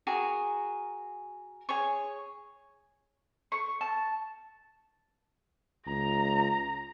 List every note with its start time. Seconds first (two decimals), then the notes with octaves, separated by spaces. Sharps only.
0.07 F#4 G#4 A#4
1.69 G#4 C#5 C#6
3.52 C#6
3.81 A5
5.87 C#2 A#5